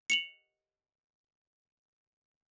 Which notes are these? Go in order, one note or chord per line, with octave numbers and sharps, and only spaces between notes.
C#7 F7 F#7